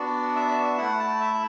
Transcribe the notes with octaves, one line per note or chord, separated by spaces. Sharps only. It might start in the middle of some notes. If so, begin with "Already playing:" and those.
Already playing: B3 D4 F#4 D5
E5
D5
E5
A3 E4 F#5
A5
E5